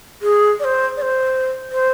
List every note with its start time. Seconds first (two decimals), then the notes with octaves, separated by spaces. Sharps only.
0.22 G#4
0.60 D5
0.64 C5
0.97 D5
1.02 C5
1.72 C5